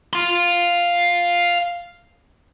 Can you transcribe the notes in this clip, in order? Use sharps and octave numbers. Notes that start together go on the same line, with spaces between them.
F5 C6